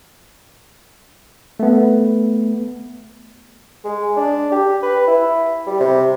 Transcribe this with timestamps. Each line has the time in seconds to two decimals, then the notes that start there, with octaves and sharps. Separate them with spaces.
1.60 A3 B3
3.84 G#3
4.17 D4
4.52 G4
4.83 B4
5.07 E4
5.67 G3
5.80 C3